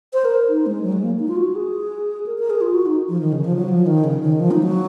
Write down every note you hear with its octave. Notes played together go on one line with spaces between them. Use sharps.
C5
A#4
D#4
G#3
F#3
G#3
A#3
D#4
F4
F#4
G#4
A#4
A#4
G#4
F4
F#4
D#4
F3
D#3
C#3
F3
F#3
F3
D#3
C#3
D#3
F3
D#4
F#3